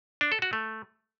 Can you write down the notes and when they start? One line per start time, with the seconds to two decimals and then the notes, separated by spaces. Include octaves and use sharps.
0.21 D4
0.32 A4
0.42 F#4
0.53 A3